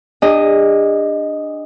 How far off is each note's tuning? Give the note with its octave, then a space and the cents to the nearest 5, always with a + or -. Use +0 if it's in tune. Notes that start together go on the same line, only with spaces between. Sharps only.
D4 +15 G#4 -45 D#5 +0